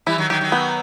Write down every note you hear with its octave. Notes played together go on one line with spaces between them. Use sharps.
E3 G3 E4
D#3 F#3
D#3 F#3 G4
D#3 F#3
B3